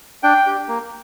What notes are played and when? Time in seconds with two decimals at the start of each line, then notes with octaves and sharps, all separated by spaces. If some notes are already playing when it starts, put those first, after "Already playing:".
0.23 D4 G5
0.46 G4
0.68 A#3